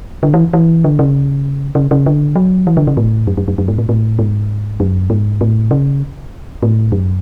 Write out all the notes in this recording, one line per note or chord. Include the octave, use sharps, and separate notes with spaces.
D3
E3
E3
D3
C#3
C#3
C#3
D3
F#3
E3
D3
C#3
A2
F#2
F#2
F#2
F#2
G#2
A2
A2
G#2
F#2
G#2
A2
C#3
A2
F#2